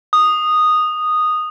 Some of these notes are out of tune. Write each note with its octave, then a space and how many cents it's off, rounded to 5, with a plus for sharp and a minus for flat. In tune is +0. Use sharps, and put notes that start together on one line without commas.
D#6 -10